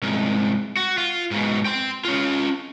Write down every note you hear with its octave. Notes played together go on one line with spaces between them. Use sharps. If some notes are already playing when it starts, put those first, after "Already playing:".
C2 G#2
F#4
F4
G#2 B2
G5 C6
C#4 F4